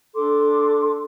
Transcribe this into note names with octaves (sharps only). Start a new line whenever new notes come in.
D4 A4 C6 D6